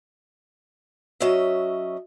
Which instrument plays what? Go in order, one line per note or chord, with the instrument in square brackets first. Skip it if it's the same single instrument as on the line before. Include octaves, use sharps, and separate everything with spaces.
[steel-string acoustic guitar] F#3 C#4 D#5 E5